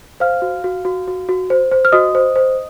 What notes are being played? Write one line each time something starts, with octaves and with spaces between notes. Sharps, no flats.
C5 F5 F6
F#4
F#4
F#4
F#4
F#4
C5
C5
F6
F#4 D#5 D#6
C5
C5